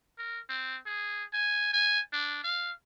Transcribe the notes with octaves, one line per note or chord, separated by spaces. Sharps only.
A#4
C4
G#4
G#5
G#5
D4
F5